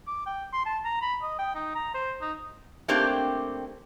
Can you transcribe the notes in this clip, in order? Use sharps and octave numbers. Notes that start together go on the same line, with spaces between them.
D6
G5
C6
A5
A#5
B5
D#5
G5
D#4
A#5
C5
D#4
A3 A#3 C4 D4 G4